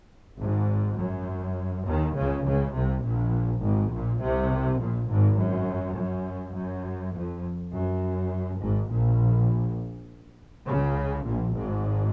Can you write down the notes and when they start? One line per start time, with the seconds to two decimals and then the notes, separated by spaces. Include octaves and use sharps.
0.40 G#1 G#2
0.99 F#2
1.87 D#2 D#3
2.16 C#2 C#3
2.45 C#2 C#3
2.75 C2 C3
3.04 A#1 A#2
3.63 G#1 G#2
3.92 A#1 A#2
4.21 C2 C3
4.80 A#1 A#2
5.09 G#1 G#2
5.38 F#2
5.97 F#2
6.56 F#2
7.14 F2
7.74 F#2
8.61 G#1 G#2
8.90 A#1 A#2
10.66 C#2 C#3
11.25 A#1 A#2
11.55 G#1 G#2